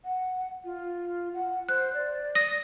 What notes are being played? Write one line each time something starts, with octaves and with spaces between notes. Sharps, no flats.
F#5
F4
F#5
C5 F#6
D5
D#6 A#6 D#7